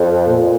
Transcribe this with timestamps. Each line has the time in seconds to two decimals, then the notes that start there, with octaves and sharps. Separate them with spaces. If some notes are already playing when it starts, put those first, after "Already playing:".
Already playing: F2
0.28 A#2